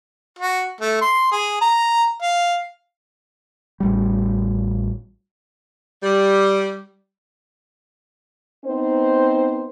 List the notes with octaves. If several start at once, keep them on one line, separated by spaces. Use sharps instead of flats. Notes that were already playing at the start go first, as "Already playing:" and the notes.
F#4
A3
C6
G#4
A#5
F5
A1 G3
G3
B3 C4 D#4 C5